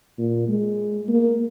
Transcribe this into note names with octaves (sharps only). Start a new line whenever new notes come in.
A#2
G#3
A#3